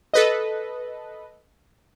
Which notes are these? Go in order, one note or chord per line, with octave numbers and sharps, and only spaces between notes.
A4 B4 D#5